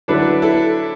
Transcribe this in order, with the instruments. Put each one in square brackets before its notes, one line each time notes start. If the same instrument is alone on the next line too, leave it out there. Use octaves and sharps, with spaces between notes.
[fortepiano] D3 F#3 D4 B4 [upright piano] E4 A4
[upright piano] E4 A4